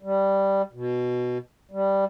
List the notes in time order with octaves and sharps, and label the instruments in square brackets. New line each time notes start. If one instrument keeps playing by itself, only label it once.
[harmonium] G3
B2
G3